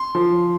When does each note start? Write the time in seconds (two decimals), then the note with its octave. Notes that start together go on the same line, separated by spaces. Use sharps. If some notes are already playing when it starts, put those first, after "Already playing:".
Already playing: C6
0.15 F3